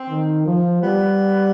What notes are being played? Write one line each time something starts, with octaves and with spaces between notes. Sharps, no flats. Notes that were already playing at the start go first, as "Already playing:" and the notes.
Already playing: C4
D#3
F3
G3 B3